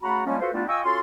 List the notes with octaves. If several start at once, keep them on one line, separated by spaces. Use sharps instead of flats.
C#3 A3 F#4 F#5 A#5 B5
F3 G3 G#3 A#3 C#4
F4 F#4 A4 B4 C5
G3 A3 B3 D4 E4 F4
F4 D#5 G5 G#5 C#6 E6
C#4 F4 F#4 A4 F5 C6